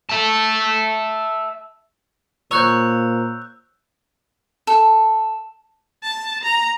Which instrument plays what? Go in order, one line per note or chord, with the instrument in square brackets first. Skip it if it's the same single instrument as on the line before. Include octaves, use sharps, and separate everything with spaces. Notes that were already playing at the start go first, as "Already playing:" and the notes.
[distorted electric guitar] E5 A5
[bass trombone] A#2 [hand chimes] C5 A#5 [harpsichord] C#5 [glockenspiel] E6 F#6 G6
[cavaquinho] A4
[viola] A5
A#5